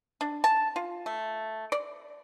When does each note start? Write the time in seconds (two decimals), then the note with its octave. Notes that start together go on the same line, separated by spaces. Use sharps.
0.21 D4
0.44 A5
0.76 F4
1.06 A3
1.72 D5